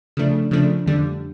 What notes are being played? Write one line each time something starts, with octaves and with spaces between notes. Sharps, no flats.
C#3 F3 A3 D4
C#3 F3 A3 D4
F2 D3 G3